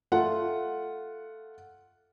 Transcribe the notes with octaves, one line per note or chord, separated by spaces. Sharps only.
A3 F4 F#5